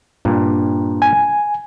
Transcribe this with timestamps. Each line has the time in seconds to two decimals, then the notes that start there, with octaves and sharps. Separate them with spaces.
0.25 G2 A#2
1.02 G#5